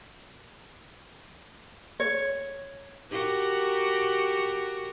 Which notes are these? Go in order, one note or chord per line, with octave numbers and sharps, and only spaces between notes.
C#5
F#4 G4 A#4